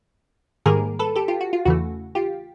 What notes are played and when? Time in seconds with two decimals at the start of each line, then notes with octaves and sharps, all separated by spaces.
0.66 G#2 D#3 G3 A#3 G#4 A#4
0.99 A4 B4
1.16 G4 A4
1.28 F4 G4
1.41 F#4
1.53 F4
1.65 E2 C#3 E3 A3 F#4
2.15 F4 G4